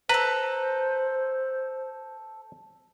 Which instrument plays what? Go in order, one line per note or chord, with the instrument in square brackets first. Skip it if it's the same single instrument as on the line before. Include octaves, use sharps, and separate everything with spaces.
[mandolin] A4 A#5 [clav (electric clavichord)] B4 [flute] C5